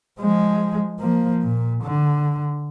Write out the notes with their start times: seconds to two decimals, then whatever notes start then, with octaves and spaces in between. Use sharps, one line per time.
0.20 F3 G#3
1.00 F3 A#3
1.43 A#2
1.84 D3